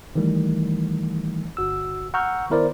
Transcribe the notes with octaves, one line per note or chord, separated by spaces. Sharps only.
D#3 E3 G3 A3
G1 F#4 E6
F#5 A#5 C#6 E6 F6 G6
D#3 B3 E4 A#4 C5 D5